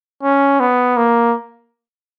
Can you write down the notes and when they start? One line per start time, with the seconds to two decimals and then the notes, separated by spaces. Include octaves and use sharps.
0.23 C#4
0.60 B3
0.97 A#3